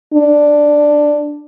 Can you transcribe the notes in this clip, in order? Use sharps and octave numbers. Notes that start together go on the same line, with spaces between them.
D4